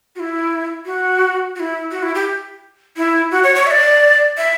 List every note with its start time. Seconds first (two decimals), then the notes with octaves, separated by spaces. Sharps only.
0.16 F#4
0.20 E4
0.86 F#4
1.56 F#4
1.60 E4
1.91 F#4
2.03 E4
2.15 G4
2.97 E4
3.31 F#4
3.43 C#5
3.56 C#5
3.67 E5
3.71 D5
4.38 E5